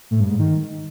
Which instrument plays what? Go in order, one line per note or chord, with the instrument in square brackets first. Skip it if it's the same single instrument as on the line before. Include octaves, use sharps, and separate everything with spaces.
[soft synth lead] A2
G2
G#2
D#3